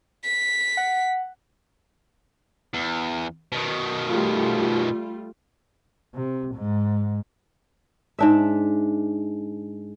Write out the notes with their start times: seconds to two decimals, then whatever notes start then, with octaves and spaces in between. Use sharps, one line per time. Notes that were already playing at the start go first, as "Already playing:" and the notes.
0.24 B6
0.77 F#5
2.74 E2
3.52 B2 D#3
4.06 G3 A3 F4
6.15 C3
6.55 G#2
8.19 G#2 D4 E5